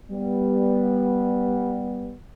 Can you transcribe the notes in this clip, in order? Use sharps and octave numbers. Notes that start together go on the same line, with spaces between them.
G3 B3